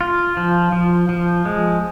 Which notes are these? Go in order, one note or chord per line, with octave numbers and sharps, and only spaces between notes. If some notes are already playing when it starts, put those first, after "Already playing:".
F4
F3
F3
F3
G#3